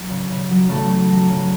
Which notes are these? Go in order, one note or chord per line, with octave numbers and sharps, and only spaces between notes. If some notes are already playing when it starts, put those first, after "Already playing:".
Already playing: F#3
C#3
C#3
F#3
C#3 A3 A4
F#3
F#3
C#3